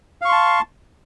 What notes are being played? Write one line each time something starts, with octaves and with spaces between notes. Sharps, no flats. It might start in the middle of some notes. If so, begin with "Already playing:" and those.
F5 A5 C6 C#6